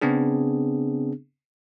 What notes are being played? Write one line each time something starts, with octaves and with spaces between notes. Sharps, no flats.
C#3 B3 C4 D4 G#4